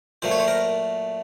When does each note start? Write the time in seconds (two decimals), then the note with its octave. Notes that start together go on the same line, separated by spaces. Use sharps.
0.22 A#2 F#3 A3 C5
0.31 C#5
0.40 C5
0.48 A#4